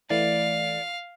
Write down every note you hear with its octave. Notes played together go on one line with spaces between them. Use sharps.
E3 A3 E4 D5 F5